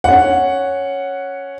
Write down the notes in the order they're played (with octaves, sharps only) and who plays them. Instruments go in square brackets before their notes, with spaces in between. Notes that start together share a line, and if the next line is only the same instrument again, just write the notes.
[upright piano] C#4 F#5